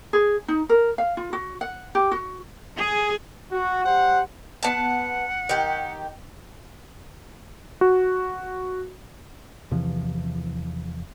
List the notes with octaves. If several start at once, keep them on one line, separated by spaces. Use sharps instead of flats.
G#4
D#4
A#4
F5
F4
F#4
F#5
G4
F#4
G#4
F#4
G3 G4 C5 F#5
B3 F#5 A5
D#3 G4
F#4
E2 C3 E3 F3